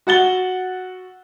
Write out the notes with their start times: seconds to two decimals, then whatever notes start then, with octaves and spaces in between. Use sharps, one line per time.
0.07 F#4 F#5 A6 G7